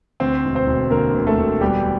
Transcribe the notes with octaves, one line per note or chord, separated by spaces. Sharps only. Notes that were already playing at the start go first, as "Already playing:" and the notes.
D2 C4 C5
E1
C4 C5
E1
D3 A#3 A#4
D2
A3 A4
E1
E2 G3 G4